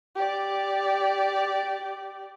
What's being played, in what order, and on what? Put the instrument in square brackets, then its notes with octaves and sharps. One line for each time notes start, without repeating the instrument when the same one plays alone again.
[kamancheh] G4 D5